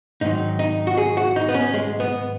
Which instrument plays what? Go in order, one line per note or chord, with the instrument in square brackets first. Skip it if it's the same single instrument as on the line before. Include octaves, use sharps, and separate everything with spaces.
[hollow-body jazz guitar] G#2 D#3 F#3 D#4
D#4
F#4
G#4
F#4
D#4
B3
C#4
G#3
B3